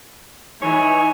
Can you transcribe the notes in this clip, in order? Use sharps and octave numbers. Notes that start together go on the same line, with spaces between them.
E3 D#4 C#5 G#5